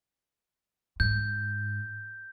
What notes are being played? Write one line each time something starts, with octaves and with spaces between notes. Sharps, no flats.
G#2 G6